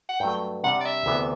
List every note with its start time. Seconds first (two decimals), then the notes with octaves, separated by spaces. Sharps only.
0.09 F#5
0.20 G2 F#3 A3 G5
0.64 C3 G3 D4 F#5
0.81 D5
0.85 E5
1.06 D2 C3 E3 B3